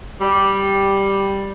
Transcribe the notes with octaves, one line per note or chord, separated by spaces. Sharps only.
G3